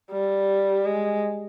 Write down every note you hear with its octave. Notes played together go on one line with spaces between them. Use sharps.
G3
G#3